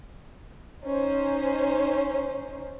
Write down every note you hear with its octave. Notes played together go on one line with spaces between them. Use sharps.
C#4 D#4 C5